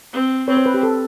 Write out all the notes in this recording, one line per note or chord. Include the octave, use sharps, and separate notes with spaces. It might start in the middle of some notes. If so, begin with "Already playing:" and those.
C4
C4 B4 C#5
C5
B4
G4
A4